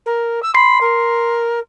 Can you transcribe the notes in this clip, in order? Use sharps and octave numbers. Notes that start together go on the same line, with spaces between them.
A#4
E6
B5 C6 C7
A#4